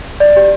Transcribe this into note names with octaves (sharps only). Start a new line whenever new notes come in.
D5
G4